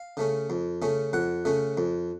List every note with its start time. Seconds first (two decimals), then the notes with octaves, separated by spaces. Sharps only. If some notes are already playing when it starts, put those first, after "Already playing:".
Already playing: F5
0.17 C#3 A3 C#4
0.50 F2
0.82 C#3 A3 C#4
1.13 F2 F#5
1.45 C#3 A3 C#4
1.77 F2